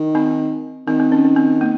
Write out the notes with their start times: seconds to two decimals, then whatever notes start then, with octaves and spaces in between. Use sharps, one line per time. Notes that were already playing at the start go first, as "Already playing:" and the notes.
Already playing: D#3
0.15 C4 D#4
0.87 D#3 C4
1.00 C4
1.12 C#4
1.25 C#4
1.37 C4
1.61 A#3